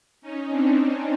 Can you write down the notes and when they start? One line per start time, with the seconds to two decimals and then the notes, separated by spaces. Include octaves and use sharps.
0.22 C#4 D#4
0.50 C4 D4
0.78 C4 D4